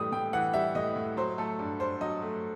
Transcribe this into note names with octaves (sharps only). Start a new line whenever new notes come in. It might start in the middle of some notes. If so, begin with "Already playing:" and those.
Already playing: A2 E3 G3 D#6
A2 G5
E3 F#5
G3 E5
A2 D#5
A2
F#3 C5
A3 A4
G2
G2 C5
F#3 D#5
A3